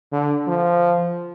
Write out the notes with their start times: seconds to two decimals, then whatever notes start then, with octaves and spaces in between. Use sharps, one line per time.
0.12 D3
0.47 F3